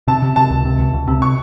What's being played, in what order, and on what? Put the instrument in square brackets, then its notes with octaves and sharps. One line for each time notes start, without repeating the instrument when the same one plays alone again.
[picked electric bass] C3 [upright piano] A5
[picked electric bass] C3
[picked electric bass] C3 [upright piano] A5
[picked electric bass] C#2
C3
C#2
C#2
C3
[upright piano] C#6